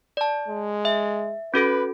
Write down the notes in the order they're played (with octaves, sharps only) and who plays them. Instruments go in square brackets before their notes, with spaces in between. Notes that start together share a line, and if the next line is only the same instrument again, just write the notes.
[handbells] D5 A5
[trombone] G#3
[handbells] E5
[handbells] C#4 F#4 A4 [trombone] B4